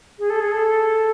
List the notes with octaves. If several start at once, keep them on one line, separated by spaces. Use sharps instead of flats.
G#4
A4
G#4
A4